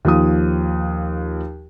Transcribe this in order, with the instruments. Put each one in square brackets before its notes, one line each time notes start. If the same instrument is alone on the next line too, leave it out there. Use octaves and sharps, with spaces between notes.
[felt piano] D#2 F3 D#6